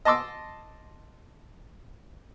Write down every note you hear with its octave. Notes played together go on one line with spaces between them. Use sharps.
D#5 A5 C6 D6 E6